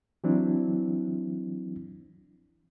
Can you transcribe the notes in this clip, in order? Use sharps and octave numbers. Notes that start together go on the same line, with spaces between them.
E3 F#3 C4 D4 E4